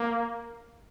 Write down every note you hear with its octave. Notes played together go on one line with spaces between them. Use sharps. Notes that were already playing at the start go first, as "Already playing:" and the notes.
Already playing: A#3